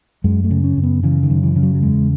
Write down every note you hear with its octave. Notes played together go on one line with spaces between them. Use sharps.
F#2 G#3
A3
C#3
C#4
F#2
B3
C#3 E3
D#3
F#2
E3
C#3
F#3
F#3
E2 G#3